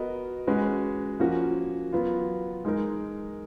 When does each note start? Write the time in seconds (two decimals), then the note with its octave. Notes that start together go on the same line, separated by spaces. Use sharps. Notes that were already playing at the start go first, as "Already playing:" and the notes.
Already playing: B3 F#4 A#4 D#5
0.47 G#3 C#4 F#4 B4
1.20 F3 A#3 C#4 F#4
1.93 F#3 B3 F4
2.65 G#3 D#4 A#4